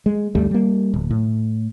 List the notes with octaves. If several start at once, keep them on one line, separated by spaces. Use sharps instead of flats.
G#3
D2 G2 G3 A3
G3 A#3
D1
A2